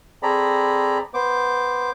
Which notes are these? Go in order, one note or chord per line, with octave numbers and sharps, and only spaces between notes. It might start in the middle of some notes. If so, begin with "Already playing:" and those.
C4 G#4 A4 D5 A#5 B5
B3 C5 D6